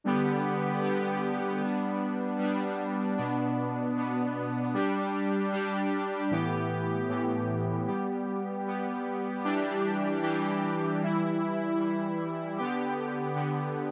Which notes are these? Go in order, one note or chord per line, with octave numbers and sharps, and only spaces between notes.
D3 G3 B3 G4
D3 G3 B3 G4
G3 B3 D4
G3 B3 D4
B2 B3 D4
B2 B3 D4
G3 D4 G4
G3 D4 G4
A2 E3 B3 G4
A2 E3 B3 G4
G3 B3 G4
G3 B3 G4
E3 G3 D4 G4
E3 G3 D4 G4
E3 G3 E4
E3 G3 E4
D3 B3 G4
D3 B3 G4